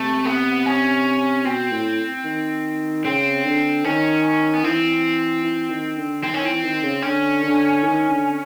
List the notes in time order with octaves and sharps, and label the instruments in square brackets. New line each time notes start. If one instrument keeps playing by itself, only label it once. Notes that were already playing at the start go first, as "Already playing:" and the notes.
Already playing: [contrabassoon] C3 [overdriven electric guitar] A3
[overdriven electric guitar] B3
C#4
[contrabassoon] B2 [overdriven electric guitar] C4
[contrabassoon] A2
D#3
[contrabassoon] C#3 [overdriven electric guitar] C4
[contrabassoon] D3
[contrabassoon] D#3 [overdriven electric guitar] C#4
[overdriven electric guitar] B3
[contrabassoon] E3 [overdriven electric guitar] C4
[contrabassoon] E3
D#3
D3
[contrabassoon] D#3 [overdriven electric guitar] C4
[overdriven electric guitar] C#4
[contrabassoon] E3 [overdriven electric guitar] C4
[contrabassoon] D#3
C#3
[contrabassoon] D3 [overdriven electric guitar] C#4
[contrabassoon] D3
D#3
D3